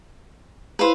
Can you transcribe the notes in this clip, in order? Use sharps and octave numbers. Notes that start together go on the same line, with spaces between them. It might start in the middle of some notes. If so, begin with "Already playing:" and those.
E4 B4 C5 F5